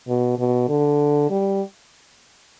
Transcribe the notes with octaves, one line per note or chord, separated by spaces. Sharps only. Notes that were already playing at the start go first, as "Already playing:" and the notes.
B2
B2
D3
G3